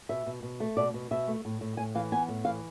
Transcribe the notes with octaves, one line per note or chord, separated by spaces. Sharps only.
B2 E5
B2
B2
A3
B2 D5
B2
B2 E5
A3
A2
A2
A2 G#5
E3 F5
B3 G#5
A2
E3 F5